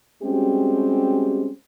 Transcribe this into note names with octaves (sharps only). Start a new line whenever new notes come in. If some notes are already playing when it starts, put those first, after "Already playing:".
G3 G#3 C4 C#4 F#4 G4